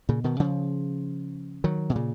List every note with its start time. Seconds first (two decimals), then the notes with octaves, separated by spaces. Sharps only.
0.09 A#2 C#3
0.24 B2 D#3
0.40 C#3 F3
1.64 D#3 F#3
1.90 B2
1.96 A#2 C#3